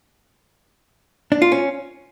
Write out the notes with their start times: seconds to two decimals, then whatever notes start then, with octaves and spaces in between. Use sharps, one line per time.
1.32 D4
1.42 F4
1.52 C#4